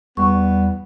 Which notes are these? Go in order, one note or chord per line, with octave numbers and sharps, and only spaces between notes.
E2 G3 B3 C#6